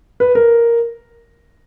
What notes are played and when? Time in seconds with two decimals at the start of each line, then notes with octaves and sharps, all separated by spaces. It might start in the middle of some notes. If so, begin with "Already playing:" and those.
0.20 B4
0.35 A#4